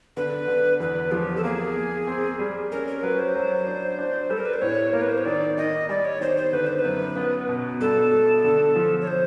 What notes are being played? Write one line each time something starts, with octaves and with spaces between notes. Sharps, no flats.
D3 B4
D3
E2 B4
F3 G4
A4
A#3 G#4
A#3
C4
G3
C#4 A#4
A#4
F#3 B4
C5
F#3
D4
D4
G3 A4
A#4
B4
C5
A2 C#5
A#3 A#4
B4
C5
C#5
D#3 D5
D#3 D#5
G3 D5
C#5
D#3 C5
C5
D3 B4
C5
B4
F#2
B3
B2
G2 A4
A3
D3
F3
C#5
C5